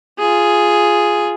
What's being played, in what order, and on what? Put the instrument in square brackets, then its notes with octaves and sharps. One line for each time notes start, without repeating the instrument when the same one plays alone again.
[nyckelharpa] F4 G#4